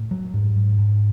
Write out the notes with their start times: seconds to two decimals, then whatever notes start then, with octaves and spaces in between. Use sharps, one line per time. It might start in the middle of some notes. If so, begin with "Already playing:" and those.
Already playing: A2
0.11 F#3
0.34 G#2
0.56 G#2
0.78 G#2